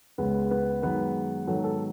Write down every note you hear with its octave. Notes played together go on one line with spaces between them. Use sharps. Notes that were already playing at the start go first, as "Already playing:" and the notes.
C#2 C#3 G#3 B3 B4
B3 B4
F#2 D#3 G#3 B3 B4
G#2 D#3 F#3 B3 A4
A4